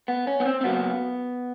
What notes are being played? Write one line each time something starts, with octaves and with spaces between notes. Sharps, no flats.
B3
C#4
B3
C4
C4
C#3 F#3 A#3 B3